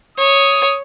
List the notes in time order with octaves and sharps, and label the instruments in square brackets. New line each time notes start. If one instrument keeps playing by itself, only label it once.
[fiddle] C#5 [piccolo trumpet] D#6